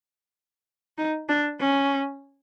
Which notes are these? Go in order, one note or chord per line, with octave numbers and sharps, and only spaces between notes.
D#4
D4
C#4